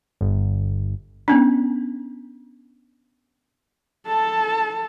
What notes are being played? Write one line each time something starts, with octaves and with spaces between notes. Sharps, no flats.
G1
B3 C#4 D4
A4 A5